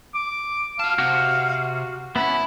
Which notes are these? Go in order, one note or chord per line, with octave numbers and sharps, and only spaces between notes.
D6
F#4 F5 A5
C3 F#4
B3 C#4 E4 B5